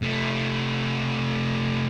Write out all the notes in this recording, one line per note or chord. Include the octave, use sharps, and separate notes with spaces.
C3 A3